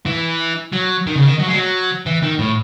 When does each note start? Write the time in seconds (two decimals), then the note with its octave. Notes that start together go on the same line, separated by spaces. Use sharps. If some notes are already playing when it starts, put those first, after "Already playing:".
0.06 E3
0.72 F#3
1.07 D#3
1.16 C#3
1.26 D#3
1.39 F#3
1.47 G#3
1.54 F#3
2.06 E3
2.23 D#3
2.39 A2